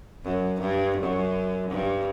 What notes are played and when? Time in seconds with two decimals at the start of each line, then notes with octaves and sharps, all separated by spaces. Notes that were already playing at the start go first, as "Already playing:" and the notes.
0.24 F#2
0.61 G2
0.98 F#2
1.70 G2